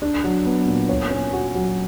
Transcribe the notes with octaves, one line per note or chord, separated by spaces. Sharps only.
D4
F#3
B3
A#2
C#5
C#4
F#4
F#3